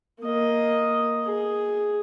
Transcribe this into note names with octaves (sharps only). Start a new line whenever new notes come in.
A#3 D#5
G#4